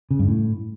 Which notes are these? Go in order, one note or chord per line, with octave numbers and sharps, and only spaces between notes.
C#3
G2
A2